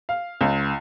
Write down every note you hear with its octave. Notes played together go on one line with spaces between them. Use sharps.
F5
C#2